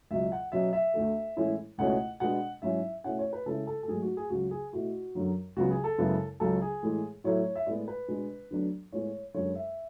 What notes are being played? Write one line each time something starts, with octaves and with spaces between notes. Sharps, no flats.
C#2 B2 F#3 E5
F#5
B2 F#3 C#4 E5
E5
D2 D3 A3
A2 E3 G#3 C#4 E4
C#2 B2 A3 C#4 E4 F#5
B2 G#3 B3 D4 F#5
G#2 F#3 C#4 E4 E5
B2 A3 C#4 E4 F#5
C#5
B4
C#3 G#3 C#4 E4 A4
A4
A4
G#2 F#3 A3 G#4
F#4
G#4
C#2 C#3 F#3 F#4
G#4
B2 A3 E4 F#4
F#2 D3 F#3
C#2 C#3 F#3 B3 F#4
G#4
A4
F#2 C#3 G#3 B3 E4
C#2 C#3 F#3 C#4 A4
G#4
A2 E3 G#3
A2 F#3 A3 E4 C#5
E5
A2 G#3 B3 D5
B4
B2 G#3 D4
D2 D3 F#3 B3 D4
A2 G#3 B3 E4 C#5
F#2 D3 G#3 C#5
E5